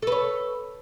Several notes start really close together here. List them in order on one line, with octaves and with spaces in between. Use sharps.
A4 B4 C#5